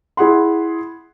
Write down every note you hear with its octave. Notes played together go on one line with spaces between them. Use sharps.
E4 G#4 F#5 C6